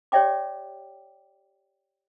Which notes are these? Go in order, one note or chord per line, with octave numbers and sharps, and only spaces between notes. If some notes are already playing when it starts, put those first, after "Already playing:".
G4 C#5 D5 E5 G5 D6